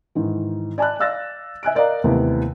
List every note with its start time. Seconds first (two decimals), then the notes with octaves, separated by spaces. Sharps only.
0.15 G#2 D#3 E3
0.78 D5 G#5 A5 B5 F#6
1.00 D5 F5 E6 F#6 A6 A#6
1.63 E5 G#5 F#6 D7
1.75 A#4 D5 D#5 F5 A#5
2.04 D#2 C3 E3 A3 B3